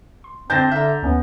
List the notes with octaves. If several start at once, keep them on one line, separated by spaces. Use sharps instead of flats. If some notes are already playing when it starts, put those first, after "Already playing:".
C6
D3 C4 D4 C5 G6 A6 A#6
D3 E5 A#5 F6
D#2 B3 C#4